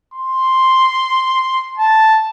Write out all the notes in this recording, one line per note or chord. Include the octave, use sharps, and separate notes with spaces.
C6
A5